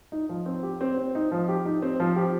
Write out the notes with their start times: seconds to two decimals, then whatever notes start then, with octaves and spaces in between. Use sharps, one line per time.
0.12 D#4
0.29 F3
0.46 C4
0.63 G4
0.81 C4
0.98 C4
1.15 D#4
1.32 F3
1.48 G4
1.65 D#4
1.82 C4
2.00 F3
2.16 G4